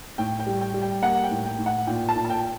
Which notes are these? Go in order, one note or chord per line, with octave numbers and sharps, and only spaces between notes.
A2 G5
G5
G3
G5
G3
G5
A#3 F#5
G5
A2
G5
A2
F#5
A#2 G5
A5
A#2
A5
G5